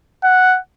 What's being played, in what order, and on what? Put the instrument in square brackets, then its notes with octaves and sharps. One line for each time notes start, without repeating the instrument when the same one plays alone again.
[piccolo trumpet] F#5